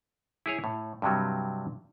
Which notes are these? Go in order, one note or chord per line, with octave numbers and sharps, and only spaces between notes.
E4 G#4 C#5
A2
G2 C3 F#3 G3